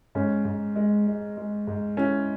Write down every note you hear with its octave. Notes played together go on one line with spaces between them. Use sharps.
G#2 C#4
G#2
G#3
G#3
G#3
G#2
C#4 E4